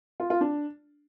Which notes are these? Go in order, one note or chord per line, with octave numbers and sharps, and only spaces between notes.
F4
F4
D4